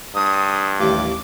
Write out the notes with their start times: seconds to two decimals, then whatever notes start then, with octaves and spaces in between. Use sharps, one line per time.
0.15 G2 D#6
0.80 A1 D#2 D6